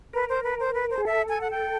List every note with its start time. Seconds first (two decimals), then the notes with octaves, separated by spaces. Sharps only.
0.13 A#4 B4
0.29 C5
0.44 B4
0.60 C5
0.75 B4
0.91 C5
0.98 G#4
1.05 A4 E5
1.29 G#5
1.41 F#5
1.51 G5